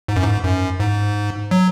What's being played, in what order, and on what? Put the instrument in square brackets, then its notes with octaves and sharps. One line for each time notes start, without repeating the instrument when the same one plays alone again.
[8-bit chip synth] G#2
F#2
G#2
F#2
G#2
F#3